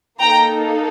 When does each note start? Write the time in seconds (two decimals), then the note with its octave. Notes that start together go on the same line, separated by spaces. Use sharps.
0.20 A#3 D#4 A4 G5 A#5